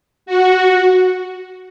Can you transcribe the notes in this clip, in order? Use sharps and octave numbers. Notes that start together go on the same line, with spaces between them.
F#4